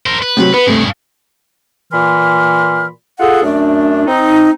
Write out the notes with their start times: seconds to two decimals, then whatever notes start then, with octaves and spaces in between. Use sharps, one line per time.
0.06 A#4 C5
0.22 B4
0.37 A2 C3 F#3
0.54 B3 B4
0.67 G2 C3 A3 G#4
1.93 A#2 E3 B5 C6 F6
3.18 F4 G#4 A4 F#5
3.43 F#2 A3 D4
4.07 C4 D#4